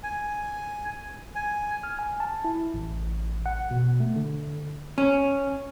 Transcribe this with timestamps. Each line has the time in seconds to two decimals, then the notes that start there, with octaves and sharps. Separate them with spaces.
0.03 G#5
1.35 G#5
1.83 F6
1.99 G#5
2.20 A5
2.45 E4
2.74 A1
3.46 F#5
3.71 B2
4.00 A3
4.16 D3
4.98 C#4